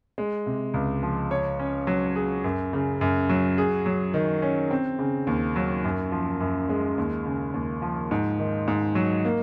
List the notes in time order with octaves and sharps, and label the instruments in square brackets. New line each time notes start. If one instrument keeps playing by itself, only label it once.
[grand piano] G#3
C3
C#2
F3
C#5
C#4
F#3
G#4
F#2
C#3
F#2
F#3
G#4
F#3
D#3
C#4
C4
C#3
D#2
F#3
F#2
F3
F#2
G#3
D#2
C#3
D#2
F3
G#2
D#3
G#2
F#3
A#3